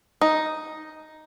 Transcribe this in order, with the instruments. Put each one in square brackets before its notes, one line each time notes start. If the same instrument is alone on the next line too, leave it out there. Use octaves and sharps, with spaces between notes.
[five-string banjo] D#4